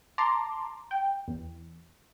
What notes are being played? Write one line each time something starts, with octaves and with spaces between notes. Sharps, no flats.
A5 A#5 C6 D6
G5
E2